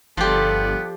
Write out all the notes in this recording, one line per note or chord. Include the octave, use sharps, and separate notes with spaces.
G1 F3 B3 G4 A4 D5